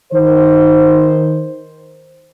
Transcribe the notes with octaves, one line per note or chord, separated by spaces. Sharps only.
D#3 C5